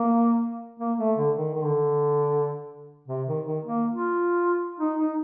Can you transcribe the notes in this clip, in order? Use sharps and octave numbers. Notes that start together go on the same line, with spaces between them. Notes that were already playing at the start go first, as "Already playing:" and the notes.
Already playing: A#3
A#3
A3
D3
D#3
D#3
D3
C3
D#3
D#3
A#3
F4
D#4
D#4